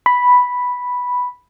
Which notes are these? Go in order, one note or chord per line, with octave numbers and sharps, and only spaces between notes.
B5